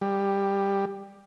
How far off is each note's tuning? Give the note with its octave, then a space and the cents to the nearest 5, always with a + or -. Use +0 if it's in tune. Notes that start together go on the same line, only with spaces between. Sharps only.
G3 +10